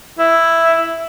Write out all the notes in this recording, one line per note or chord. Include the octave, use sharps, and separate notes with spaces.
E4